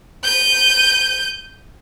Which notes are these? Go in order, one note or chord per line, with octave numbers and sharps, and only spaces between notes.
G6 D#7